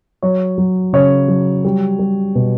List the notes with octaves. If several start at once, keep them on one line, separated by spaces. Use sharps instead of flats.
F#3 C#5
F#3
C#3 C#5
F#3
G3
G3
B2